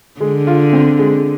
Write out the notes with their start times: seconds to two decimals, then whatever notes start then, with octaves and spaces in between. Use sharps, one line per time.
0.20 D3 G#3
0.47 F4
0.73 C4
0.99 G#3